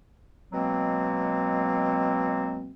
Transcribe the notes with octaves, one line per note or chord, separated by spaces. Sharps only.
B2 F#3 G#3 A#3 C4